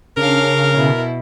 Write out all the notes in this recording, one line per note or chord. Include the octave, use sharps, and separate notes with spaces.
C#3 C#4 D4 A#4 F5
B2 E4